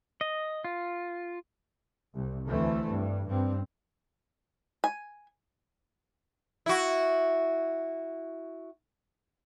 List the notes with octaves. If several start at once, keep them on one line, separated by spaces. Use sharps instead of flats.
D#5
F4
C2
D2 E3 A3 C4
G2
G2 C4
G#5
E4 F#4